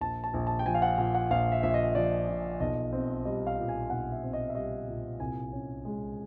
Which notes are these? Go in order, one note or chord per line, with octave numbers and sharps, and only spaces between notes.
A#1 A5
A5
A#1
A5
G5
F3 G#5
F5
F#5
A#2 F#5
F#5
A#1 F5
E5
A#1 E5
D#5
F3 D5
A#2
B1 D#5
C4
G3 D#5
F5
A#2
G#5
B1 F#5
E5
C4
D#5
E5
G3 D#5
A#2
C2 G#5
C#4
G#3